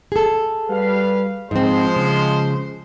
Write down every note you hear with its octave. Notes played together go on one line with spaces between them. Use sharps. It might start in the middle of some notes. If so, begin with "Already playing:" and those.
G#4 A4
G3 B4 F5
G#2 F3 G#3 C4 C5
C#3